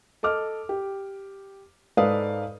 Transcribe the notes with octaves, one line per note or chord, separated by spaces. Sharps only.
A4 D#5 D6 F6
G4
G#2 A4 B4 D5 F5 D#6